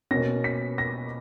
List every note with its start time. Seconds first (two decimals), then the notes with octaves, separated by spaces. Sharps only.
0.11 B2 A#3 C#4 A#6
0.44 B6
0.78 A#6